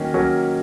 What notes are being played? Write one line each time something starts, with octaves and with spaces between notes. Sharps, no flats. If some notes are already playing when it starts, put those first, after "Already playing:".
Already playing: D#3 F#3 A#3 C#4
F#3 A#3 C#4